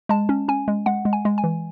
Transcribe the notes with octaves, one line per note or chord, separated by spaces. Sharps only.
G#3 A5
C#4
C#4 G#5
G#3
G#3 F#5
G#3
G#5
G#3
G#5
E3